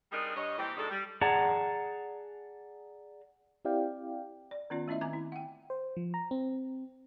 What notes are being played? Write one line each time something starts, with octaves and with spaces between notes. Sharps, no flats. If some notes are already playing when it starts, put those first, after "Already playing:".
G3 C4 D4 D#4 G#4 A#4
G2 C#5 D#5
A#2 E3 C4 G4
G#2 B2 G#3 D4 D#4 A4
G3
G#4 D5 F#5 A5 A#5
C4 E4 G4 D5 F5 G5
D5
D#3 B3 C#4 F4 D5
A3 C#4 E4 D#5 E5
D#3 C4 G#5 A#5 D6
E4
F#5 G5
C5
F3
A#5
C4